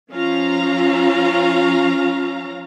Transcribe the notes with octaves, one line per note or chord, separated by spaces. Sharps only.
F3 C#4 F4 F5 A#5